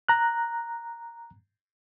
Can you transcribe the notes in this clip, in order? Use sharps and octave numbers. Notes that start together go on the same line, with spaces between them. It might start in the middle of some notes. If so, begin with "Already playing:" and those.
A#5 F#6